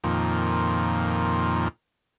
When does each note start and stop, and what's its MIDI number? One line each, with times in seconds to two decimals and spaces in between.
0.04 1.68 41
0.04 1.68 46
0.04 1.68 51